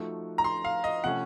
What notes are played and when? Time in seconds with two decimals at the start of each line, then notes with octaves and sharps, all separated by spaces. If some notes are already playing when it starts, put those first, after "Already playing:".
Already playing: F3 A3 D#4 F#4
0.38 A#5
0.44 C6
0.65 F5
0.84 D#5
1.04 C3 F3 A3 C#4 F#5